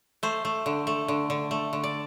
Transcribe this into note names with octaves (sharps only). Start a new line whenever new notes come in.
A3 C5
A3
D3
A3
D3
D3
A3
D3
D5